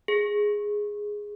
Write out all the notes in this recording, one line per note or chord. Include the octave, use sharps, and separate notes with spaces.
G#4